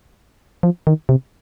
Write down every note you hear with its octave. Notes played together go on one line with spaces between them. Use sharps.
F3
D#3
C3